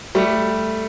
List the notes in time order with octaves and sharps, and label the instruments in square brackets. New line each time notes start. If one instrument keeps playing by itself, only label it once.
[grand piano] G3 A3